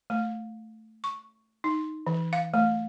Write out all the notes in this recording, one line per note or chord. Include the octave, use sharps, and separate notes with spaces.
A3
C#6
D#4
E3
F5
A3